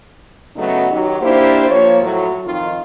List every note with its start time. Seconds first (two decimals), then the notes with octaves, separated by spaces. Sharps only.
0.56 C#3 F#3 A3 B3 D#4
0.91 D#3 F#3 G4
1.22 A#3 D4 E4 G4 C5
1.70 F3 A#3 C#5
2.02 A2 F#3
2.45 F2 D#3 F4